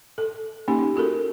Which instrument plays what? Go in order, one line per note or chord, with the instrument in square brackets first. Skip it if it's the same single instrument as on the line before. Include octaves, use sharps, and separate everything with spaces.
[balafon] A4
A#3 C#4 D#4 G4
F4 F#4 A4 A#4